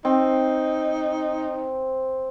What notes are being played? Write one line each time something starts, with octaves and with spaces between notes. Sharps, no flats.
C4 D#4